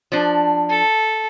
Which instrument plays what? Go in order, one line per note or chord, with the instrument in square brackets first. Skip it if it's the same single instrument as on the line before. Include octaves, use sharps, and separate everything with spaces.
[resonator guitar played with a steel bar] F3 D4
[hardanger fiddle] A4